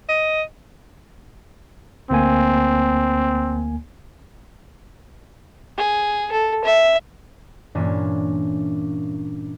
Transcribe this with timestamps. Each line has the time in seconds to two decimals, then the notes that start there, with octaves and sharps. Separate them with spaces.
0.09 D#5
2.11 D2 A#3 C4 G#5
5.78 G#4
6.32 A4
6.64 E5
7.75 G2 A#2 E3 A#3 C#4 D4